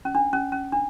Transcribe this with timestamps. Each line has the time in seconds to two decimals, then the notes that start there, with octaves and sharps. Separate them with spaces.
0.05 C#4
0.15 D4
0.33 C#4
0.52 C#4
0.72 D4